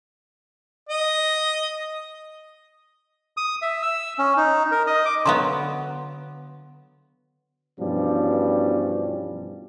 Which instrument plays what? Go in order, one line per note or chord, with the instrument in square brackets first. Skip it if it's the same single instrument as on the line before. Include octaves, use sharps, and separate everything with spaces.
[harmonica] D#5
[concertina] D#6
E5
E6
C#4
D#4
A#4
D#5
D6
[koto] D3 F#3 B3 [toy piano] F5 A#5 C6
[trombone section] G2 B2 E3 F3 G3 C#4